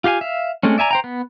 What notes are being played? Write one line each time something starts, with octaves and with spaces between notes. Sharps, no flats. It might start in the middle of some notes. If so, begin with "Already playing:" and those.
F4 G4 F5 G#5
E5 F5
G#3 A3 C4 C#4
D5 E5 G#5 A#5
C5 G5 A#5
B3